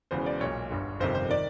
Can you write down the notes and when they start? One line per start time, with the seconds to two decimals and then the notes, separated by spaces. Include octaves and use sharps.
0.11 E1 E2 C#3 E3 C5
0.26 D5
0.40 B1 A#2 C#5
0.70 G1 G2 D3
1.00 G1 F2 C3 D#3 C5
1.15 C5
1.30 D#3 D5